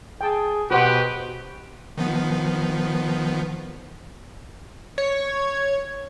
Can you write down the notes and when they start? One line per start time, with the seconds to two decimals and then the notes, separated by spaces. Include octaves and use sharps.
0.21 G#4 G5 A5
0.71 B2 F#4 G4 B4 C5 F#5
1.98 D#3 F3 B3
4.98 C#5